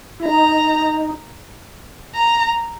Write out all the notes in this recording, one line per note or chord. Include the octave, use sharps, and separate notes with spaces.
E4
D#4 A#5
A#5